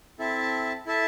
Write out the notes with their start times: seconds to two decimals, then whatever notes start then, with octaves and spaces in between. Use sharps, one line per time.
0.19 C4 E4 A4 E5 A5
0.86 E4 A4 E5 A5